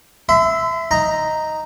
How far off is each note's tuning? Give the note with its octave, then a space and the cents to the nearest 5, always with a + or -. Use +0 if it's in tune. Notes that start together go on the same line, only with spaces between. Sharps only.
E5 +0 C6 -45
D#4 +0 A#5 +0